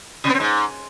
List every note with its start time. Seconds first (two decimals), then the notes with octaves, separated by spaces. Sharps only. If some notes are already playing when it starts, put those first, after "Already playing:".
0.24 C3
0.29 B3
0.35 C4
0.40 G#2